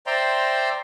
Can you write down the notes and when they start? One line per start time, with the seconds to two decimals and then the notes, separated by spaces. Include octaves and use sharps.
0.07 C5 D5 E5 G5 A#5 C6